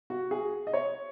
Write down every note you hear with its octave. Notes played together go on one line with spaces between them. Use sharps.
F#4
G#4
D#5
C#5